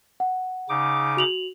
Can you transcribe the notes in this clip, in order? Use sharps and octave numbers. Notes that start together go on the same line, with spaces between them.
F#5
C#3 D#4 D6
F#4 F7 F#7